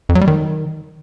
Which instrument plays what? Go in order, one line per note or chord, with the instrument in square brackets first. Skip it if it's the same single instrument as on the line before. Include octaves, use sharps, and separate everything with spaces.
[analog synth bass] F2
F#3
G3
D#3